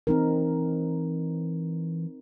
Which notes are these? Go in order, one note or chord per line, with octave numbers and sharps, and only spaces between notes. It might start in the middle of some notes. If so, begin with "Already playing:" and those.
E3 C4 D#4 A#4